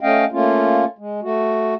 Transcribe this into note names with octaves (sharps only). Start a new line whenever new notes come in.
A3 C#4 D#5 F5 G5
A3 A#3 C#4 F4
G#3
A3 F#4